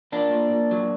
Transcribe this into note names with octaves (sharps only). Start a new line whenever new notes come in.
A#2 A#3 D4
A#2
A#2
F#3